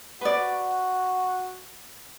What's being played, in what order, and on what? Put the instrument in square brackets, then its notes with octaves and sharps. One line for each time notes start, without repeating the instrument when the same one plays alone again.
[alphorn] F#4 [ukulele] B4 D5